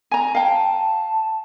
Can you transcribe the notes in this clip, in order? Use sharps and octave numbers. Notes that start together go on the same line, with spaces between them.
G#5 A#5
F5 G5 A5